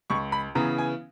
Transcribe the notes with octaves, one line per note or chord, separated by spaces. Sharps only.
C#2 C#6
B5
C#3 E3 B3 A#5
G#5